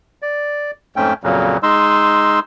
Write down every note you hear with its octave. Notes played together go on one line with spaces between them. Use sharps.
D5
F2 G#2 A3 C#4 G5
F2 A#2 C#3 F#3
G#3 D#4 C6 E6